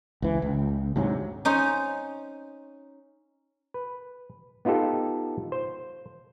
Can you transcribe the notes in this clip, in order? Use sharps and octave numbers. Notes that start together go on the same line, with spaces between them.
C#2 E3
C#2
D2 G#2 C3 F#3
C#4 D#4 C5
B4
B3 D#4 F4 G4 A4
C5